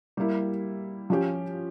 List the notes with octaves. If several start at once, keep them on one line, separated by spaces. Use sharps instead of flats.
G3 A#3 E4
F3 C#4 G4